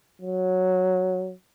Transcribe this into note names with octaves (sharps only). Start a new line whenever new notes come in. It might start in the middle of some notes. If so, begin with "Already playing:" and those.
F#3